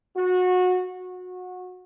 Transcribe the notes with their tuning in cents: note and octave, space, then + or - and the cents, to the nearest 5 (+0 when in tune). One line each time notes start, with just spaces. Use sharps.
F#4 -25
F#4 -25